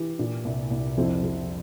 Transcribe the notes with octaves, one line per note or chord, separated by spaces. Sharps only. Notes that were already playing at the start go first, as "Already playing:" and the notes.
Already playing: E3 G4
A#2
C2
C2
F2 C4 E4
F2